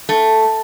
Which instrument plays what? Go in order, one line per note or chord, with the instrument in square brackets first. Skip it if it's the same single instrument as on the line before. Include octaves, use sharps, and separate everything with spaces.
[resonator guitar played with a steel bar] A3